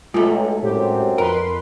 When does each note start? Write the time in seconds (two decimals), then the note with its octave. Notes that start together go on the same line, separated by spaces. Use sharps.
0.14 B1 G#2 A3 F4
0.62 F#2 A2 C4 G4
1.18 F2 A#4 B4 C6